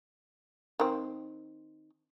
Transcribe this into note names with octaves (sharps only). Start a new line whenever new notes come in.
D#3 C4